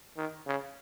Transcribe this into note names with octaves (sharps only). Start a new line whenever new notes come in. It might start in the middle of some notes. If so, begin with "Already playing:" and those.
D#3
C#3